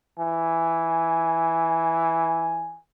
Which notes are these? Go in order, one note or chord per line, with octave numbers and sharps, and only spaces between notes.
E3 G#5